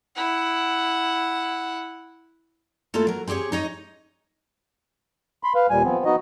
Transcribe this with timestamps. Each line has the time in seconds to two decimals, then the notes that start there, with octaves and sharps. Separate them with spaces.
0.15 E4 F#5
2.94 A3 A#3 E4 F4 A4
3.07 F#3 A#4
3.28 C4 E4 G4 G#4 C#5
3.52 D#4 C#5 D#5
5.44 B5 C6
5.55 B4 F5
5.70 D#2 A#2 G3 G#5
5.84 F3 B3 C4
6.05 B3 D#4 F#4 D#5